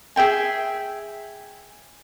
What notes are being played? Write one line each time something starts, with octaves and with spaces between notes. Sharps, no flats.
G#4 E5 G5 G#5